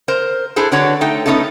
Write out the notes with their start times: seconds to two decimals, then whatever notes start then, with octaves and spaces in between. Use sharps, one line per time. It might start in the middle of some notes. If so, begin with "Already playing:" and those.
0.08 A#4 C5
0.56 D4 E4 G#4 A4 C5
0.72 D3 D4 F#4 B4 C#5
1.01 A3 D#4 G5
1.26 A3 B3 C#4 D#4 E4 A4